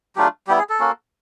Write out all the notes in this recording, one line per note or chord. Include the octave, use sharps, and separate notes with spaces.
F#3 A3 D4 F4 G4
G3 B3 E4 G4
G#4
A4
A#3 C#4 F#4